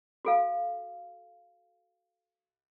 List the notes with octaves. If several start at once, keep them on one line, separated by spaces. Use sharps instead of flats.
F#4 A4 F5